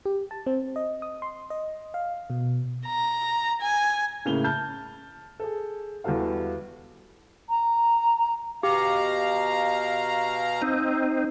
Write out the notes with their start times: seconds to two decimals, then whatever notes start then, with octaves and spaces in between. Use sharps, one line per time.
0.06 G4
0.31 A5
0.47 C4
0.76 D#5
1.02 D#6
1.22 C6
1.50 D#5
1.94 F5
2.30 B2
2.86 A#5
3.61 G#5
4.25 A2 C#3 A#3 F7 G7
4.44 A5 F6 G6
5.40 G#4 A4
6.04 E2 G3 F#4 A4 F5
7.50 A#5
8.63 B2 G4 F5 A#5
10.62 C4 D#4